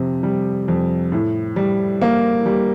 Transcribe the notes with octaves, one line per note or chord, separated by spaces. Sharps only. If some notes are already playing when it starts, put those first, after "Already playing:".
Already playing: F2 C3
G3
F2
A2
G3
A#3
G3